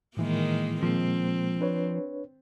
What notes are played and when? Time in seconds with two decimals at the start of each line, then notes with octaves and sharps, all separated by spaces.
0.17 A2 D#3 E3 G#3 A#3 E4
0.83 A#2 F3 G#3 A#3 C4
1.60 D4 B4 C#5